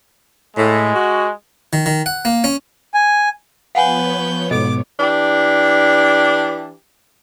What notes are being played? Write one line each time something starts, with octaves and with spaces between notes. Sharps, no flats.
A2 G#3
F#4
D#3
D#3
F#5
A#3
C#4
G#5
F3 B3 B4 C#5 F5 F#5 G#5 G6
G#2 B2 A4 D#5 D6
E3 D4 G4